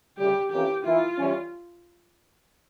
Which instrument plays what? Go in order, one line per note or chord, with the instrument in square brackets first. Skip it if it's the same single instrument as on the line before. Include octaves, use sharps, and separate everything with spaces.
[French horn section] D2 C#3 G3 [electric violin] G4
[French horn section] F2 E3 A#3 C#4 E4 [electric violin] G4
[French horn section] E3 A#3 E4 [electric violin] F4
[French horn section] E3 G3 C#4